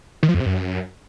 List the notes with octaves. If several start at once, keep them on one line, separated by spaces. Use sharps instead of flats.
D#3
F3
F2
C3
F#2